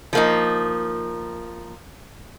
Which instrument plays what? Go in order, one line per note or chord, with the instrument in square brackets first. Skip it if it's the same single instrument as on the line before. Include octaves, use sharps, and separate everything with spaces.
[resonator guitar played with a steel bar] F3 A#3 D#4